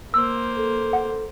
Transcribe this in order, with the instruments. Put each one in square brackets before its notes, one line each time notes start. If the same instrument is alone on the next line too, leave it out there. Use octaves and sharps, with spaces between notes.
[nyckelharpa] A#3 C5 [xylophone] E6
[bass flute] A4
[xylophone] F#5